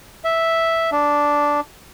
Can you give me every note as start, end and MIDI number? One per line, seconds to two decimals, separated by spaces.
0.24 0.90 76
0.92 1.60 62